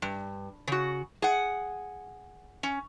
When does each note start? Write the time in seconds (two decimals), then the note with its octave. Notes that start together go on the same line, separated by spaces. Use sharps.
0.02 G2
0.67 C#3 F#4
1.22 G#4 F#5
2.63 C#4